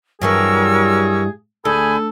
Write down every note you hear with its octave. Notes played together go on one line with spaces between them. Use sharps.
G2 E3 F#3 G3 G#4 A#4 C#6 E6
D2 G#4 A4 G#5 B5 G6